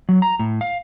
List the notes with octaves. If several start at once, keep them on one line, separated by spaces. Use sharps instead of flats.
F#3
A#5
A2
F5